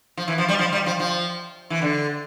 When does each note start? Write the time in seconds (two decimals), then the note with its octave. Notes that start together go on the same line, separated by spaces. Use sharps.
0.17 F3
0.28 E3
0.38 F3
0.48 G3
0.59 F3
0.72 G3
0.86 F3
1.00 F3
1.70 E3
1.82 D3